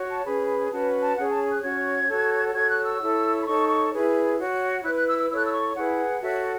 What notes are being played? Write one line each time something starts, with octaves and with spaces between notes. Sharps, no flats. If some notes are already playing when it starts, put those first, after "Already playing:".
Already playing: F#4 C#5
A5
C#4 G#4 B4 B5
B5
C#4 F#4 B4 A5
A5
C#4 G#4 C#5 F#5
A5
F#6
C#4 F#4 C#5 G#6
F#4 A4 C#5
F#4 A4 C#5 G#6
F#6
E6
E4 A4 C#5
B5
D#4 A4 C#5 C#6
C#6
E4 G#4 B4
F#4 C#5
E4 B4 F#6
F#6
E6
E6
E4 A4 C#5 E6
F#6
E6
C#6
E4 G#4 B4 F#5
F#4 A4 C#5 E5